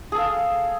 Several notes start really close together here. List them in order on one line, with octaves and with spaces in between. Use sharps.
G#4 A4 F5